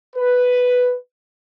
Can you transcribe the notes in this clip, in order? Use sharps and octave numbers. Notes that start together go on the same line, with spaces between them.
B4